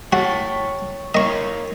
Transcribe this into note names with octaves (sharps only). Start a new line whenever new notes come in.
F#4 C#5 G5 A5
A#4 C#5 D#5 F5 C#6